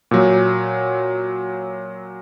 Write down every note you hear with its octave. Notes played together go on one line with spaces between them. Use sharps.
A#2 F#3